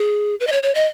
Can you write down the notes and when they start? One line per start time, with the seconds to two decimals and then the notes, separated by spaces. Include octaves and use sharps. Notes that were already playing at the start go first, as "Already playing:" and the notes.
Already playing: G#4
0.40 B4
0.47 D#5
0.52 C#5
0.63 C#5
0.75 D#5